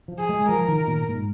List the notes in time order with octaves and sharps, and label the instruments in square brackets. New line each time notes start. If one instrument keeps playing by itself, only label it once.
[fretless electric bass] F3
[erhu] G#4
[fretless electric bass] G#3
[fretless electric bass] F3 [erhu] A#4
[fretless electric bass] D#3
A#2
G#2